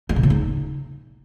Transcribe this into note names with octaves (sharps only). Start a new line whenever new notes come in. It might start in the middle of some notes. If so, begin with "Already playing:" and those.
D4
C3
C#3
D#4